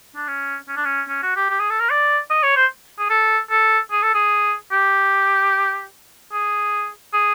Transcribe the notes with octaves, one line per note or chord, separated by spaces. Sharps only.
D4
C#4
C#4
D4
C#4
C#4
F#4
G4
G4
G#4
A4
A#4
D5
D#5
C#5
C5
G#4
A4
A4
G#4
A4
G#4
G4
G#4
G#4